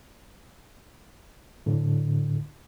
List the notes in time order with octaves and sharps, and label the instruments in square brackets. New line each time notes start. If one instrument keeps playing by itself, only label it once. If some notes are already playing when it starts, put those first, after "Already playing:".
[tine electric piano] A2 D3